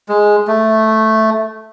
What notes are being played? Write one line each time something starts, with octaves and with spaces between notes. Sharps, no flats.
G#3
A3